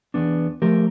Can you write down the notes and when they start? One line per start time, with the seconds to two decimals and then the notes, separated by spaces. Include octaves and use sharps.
0.14 E2 B3 D4
0.62 F3 A3 G4 A#4